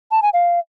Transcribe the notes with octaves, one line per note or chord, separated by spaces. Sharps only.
A5
G#5
F5